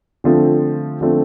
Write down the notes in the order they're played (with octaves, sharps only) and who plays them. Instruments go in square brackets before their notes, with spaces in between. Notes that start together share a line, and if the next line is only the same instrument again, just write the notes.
[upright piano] D3 F3 A3 C4
D3 F3 A3 C4